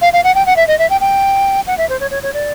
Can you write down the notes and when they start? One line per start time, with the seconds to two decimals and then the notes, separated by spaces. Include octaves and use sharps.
0.02 F5
0.13 F5
0.24 F#5
0.35 G5
0.46 F#5
0.57 E5
0.68 D#5
0.79 E5
0.90 G5
1.01 G5
1.67 F#5
1.78 E5
1.89 C5
2.00 C#5
2.11 C#5
2.23 C#5
2.34 D5